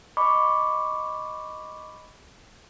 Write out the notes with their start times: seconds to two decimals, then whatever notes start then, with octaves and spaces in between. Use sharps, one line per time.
0.17 D#5 B5 C#6 D6